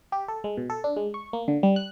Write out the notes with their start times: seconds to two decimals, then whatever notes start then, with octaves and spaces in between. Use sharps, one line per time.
0.12 G4
0.28 A4
0.44 G#3
0.57 B2
0.70 A4
0.84 D4
0.97 G#3
1.14 C#6
1.33 A#3
1.48 D3
1.63 G3
1.76 F#6